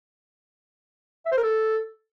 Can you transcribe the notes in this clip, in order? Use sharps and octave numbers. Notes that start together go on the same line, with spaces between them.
E5
C5
A#4
A4